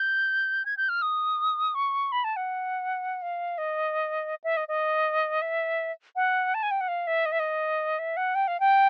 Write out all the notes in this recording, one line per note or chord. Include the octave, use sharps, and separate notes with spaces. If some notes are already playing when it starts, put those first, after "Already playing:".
Already playing: G6
G#6
G6
F6
D#6
C#6
B5
A5
F#5
F5
D#5
E5
D#5
D#5
E5
F#5
A5
G#5
G5
F#5
F5
E5
D#5
E5
D#5
E5
F#5
G5
F5
G5